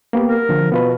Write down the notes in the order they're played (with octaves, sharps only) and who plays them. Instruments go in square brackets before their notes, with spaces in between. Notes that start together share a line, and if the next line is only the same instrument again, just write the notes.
[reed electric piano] A#3 B3 G4
[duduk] A#4
[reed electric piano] D3 F3
[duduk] B2 [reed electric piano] B3 F4 B4